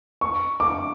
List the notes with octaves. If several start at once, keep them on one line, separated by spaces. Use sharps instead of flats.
C#6
D6